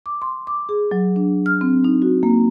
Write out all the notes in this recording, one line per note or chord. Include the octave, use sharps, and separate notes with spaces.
D6
C6
D6
G#4
F#3
D4
F6
C4
D#4
F#4
A#3